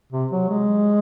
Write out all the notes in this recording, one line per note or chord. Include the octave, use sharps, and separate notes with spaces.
C3
F#3
G#3